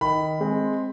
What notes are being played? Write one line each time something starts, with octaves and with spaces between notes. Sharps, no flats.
D#3 B5
G#3 C4